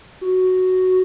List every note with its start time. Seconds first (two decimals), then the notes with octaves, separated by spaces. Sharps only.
0.21 F#4